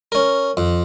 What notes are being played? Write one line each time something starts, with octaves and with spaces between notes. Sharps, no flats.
C#4 A#4
F2